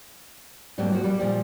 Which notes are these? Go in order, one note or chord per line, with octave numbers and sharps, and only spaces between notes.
G#2 F#3 G3 A3 A#3 C4
F3 F#4
G3 A#3
A#2 F3 G3